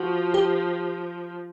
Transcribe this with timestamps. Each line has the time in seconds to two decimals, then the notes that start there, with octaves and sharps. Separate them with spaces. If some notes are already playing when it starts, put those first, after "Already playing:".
Already playing: F3 F#4
0.34 G4